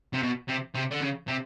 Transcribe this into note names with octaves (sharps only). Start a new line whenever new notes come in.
C3
B2
C3
C3
D3
C#3
C3